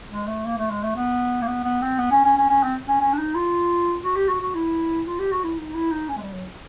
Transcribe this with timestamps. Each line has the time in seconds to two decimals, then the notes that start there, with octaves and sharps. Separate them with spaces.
0.11 G#3
0.27 A3
0.45 A#3
0.58 A3
0.70 G#3
0.83 A3
0.96 B3
1.42 A#3
1.47 B3
1.64 B3
1.82 C4
1.99 B3
2.11 C#4
2.24 C#4
2.37 C#4
2.49 C#4
2.63 C4
2.88 C#4
3.01 C#4
3.13 D4
3.19 D#4
3.35 F4
4.03 F#4
4.16 G4
4.29 F#4
4.41 F#4
4.55 E4
5.06 F4
5.19 G4
5.32 F#4
5.44 E4
5.58 D#4
5.74 E4
5.92 D#4
6.09 C#4
6.17 G#3
6.22 G3
6.34 F#3